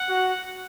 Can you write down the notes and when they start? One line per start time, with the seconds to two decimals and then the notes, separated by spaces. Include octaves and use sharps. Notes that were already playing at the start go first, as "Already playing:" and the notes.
Already playing: F#5
0.09 F#4